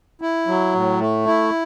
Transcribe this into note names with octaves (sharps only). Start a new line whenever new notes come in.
E4
F#3
A2
A3
E4